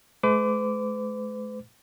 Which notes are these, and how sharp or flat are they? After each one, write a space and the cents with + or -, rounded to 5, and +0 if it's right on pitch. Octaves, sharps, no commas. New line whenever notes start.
G#3 +45 B4 +45 D6 -10